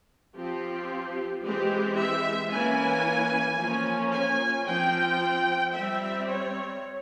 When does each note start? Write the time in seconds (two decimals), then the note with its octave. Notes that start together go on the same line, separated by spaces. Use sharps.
0.35 F3 C4 G4
1.43 E3 G#3 C4 G4
1.97 E5
2.51 E3 A#3 C#4 G#5
3.59 F3 A#3 C#4
4.13 G#5
4.66 F3 C4 G5
5.74 G3 C4 E5
6.28 C#5